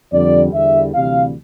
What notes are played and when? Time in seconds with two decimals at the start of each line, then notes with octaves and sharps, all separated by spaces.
0.12 F2 D3 G3 D5
0.53 E2 D3 G3 E5
0.95 D2 C3 E3 G3 F5